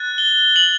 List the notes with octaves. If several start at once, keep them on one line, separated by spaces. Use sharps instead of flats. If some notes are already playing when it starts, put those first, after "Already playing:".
Already playing: F#6 A6
G7
F#7